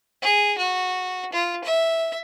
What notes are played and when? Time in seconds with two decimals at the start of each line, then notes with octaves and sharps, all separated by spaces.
0.22 G#4
0.58 F#4
1.33 F4
1.64 E5